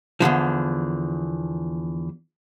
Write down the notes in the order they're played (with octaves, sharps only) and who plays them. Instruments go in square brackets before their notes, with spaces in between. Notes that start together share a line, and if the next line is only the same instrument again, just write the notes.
[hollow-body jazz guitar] E2 A2 D3 F3